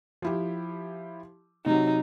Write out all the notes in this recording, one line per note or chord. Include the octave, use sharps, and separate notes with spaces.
F3 E4 G4
C3 F#3 D#4